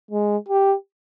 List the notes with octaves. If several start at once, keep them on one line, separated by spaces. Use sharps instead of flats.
G#3
G4